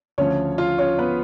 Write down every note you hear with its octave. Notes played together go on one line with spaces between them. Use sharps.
D2 C#3 F3 C#4 C#5
F4 F5
C#4 C#5
B3 B4